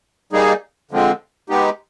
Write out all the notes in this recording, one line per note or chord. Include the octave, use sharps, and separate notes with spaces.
G3 A#3 D#4 G#4
D3 F3 G#3 C4
G#3 B3 D#4 G4